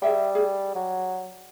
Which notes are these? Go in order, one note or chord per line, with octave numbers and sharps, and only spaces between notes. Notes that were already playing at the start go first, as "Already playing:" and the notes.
G3 G#4 E5 G5
G#4
F#3